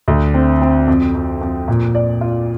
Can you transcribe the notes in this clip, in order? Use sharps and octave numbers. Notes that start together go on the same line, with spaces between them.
D2
C4
C4
F2
F2
F2
A#2
D5
F4